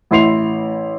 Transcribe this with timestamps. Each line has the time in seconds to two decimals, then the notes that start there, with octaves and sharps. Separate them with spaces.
0.11 A1 E4 C6 C7 F7